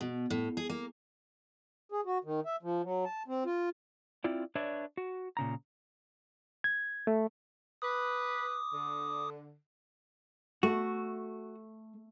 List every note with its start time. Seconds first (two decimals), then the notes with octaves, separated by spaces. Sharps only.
0.01 B2
0.30 A2
0.57 G#4
0.69 A#3
1.92 G#4
2.05 F#4
2.24 D#3
2.46 E5
2.63 F3
2.83 F#3
3.05 A5
3.28 C4
3.46 F4
4.24 C4 E4 F4 D5
4.55 D4 B4 C#5 D5 E5
4.97 F#4
5.37 A#2 C#3 A#5
6.64 G#6
7.07 A3
7.82 B4 D6 D#6
8.71 D3
10.63 A3 F#4